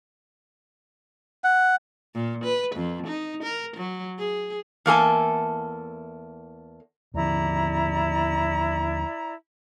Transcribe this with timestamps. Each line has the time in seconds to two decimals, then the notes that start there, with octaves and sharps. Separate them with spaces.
1.44 F#5
2.15 A#2
2.44 B4
2.76 F2
3.07 D#4
3.43 A#4
3.77 F#3
4.19 G#4
4.86 E2 A#3 A4 G#5
7.14 D#2 D3 F3 E4 D5 A#5